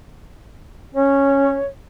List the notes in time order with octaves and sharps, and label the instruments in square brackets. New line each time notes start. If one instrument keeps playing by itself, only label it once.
[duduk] C#4 [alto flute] C#5